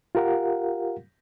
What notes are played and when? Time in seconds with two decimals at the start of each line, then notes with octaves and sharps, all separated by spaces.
0.15 F4 G4 A#4 F5 F#5